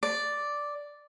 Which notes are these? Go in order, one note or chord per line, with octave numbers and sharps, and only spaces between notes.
D5